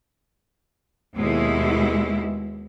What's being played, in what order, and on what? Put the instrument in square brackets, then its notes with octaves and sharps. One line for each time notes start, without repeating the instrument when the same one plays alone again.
[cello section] D#2 B2 G#3 E4